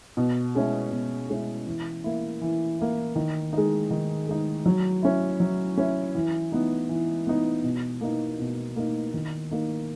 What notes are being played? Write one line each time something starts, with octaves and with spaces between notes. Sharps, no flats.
B2
G#3 C#4 E4
B2
G#3 C#4 E4
E3
A#3 E4
E3
A#3 E4
D#3
G#3 D#4
D#3
G#3 D#4
F#3
C#4 E4
F#3
C#4 E4
E3
B3 D#4
E3
B3 D#4
B2
A#3 D#4
B2
A#3 D#4
D#3
A#3 D#4